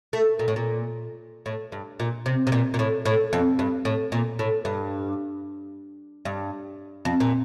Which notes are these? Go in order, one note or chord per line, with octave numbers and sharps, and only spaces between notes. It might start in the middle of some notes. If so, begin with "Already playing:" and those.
A3
A#2
A2
A#2
A2
G2
A#2
C3
C3
A#2
A#2
A2
A2
F2
G2
A2
A#2
A2
G2
G2
F2
A#2